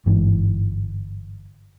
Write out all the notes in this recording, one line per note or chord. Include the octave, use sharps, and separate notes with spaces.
G1 G#2 E3